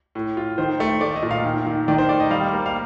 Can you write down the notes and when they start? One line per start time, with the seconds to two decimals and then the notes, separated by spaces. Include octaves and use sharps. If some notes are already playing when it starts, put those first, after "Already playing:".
0.15 A2
0.37 F4
0.58 D#3 C5
0.80 A3
1.01 A3 D5
1.15 D#5
1.22 A#2
1.31 F5
1.45 D#3
1.67 D#3
1.88 D#3 D5
1.94 A#4
1.98 C5
2.09 A3 D5
2.20 D#5
2.30 G3 F5
2.53 A#3
2.66 F5